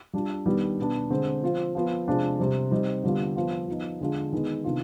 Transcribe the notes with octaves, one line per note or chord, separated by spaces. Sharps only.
G3 D4 F4
D#3 G3 B3 D4
B2 B3 D4
D3 G#3 C4
F3 C4 F4
F3 B3 F4
C3 F3 G#3 D4 F4
C3 G3 C4
G3 C4 D#4
D3 G3 B3 F4
F3 B3 F4
F3 B3 D#4
D3 G#3 D4 F4
D#3 G#3 B3 D#4
C3 D#3 B3 D4 F4